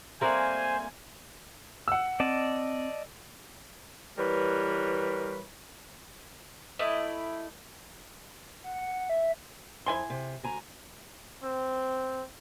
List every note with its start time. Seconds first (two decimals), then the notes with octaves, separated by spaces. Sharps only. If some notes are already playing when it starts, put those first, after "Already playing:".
0.21 G3 A3 A#3 C4 A#4 C5 F#5 G#5
1.88 F#5 E6
2.20 C4 D5 D#5 A5
4.18 E3 G3 A#4 B4 C#5
6.79 A3 E4 D5 D#5
8.64 F#5
9.10 E5
9.86 F2 E4 G#5 C6
10.10 C3
10.44 D2 G#5 A#5
11.44 C4